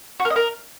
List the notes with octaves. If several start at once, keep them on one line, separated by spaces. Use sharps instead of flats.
F#4
A#4
D#5
A#4